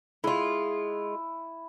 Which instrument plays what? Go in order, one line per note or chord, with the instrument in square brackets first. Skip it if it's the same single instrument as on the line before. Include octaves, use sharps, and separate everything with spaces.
[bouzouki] G#3 F4 [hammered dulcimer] E4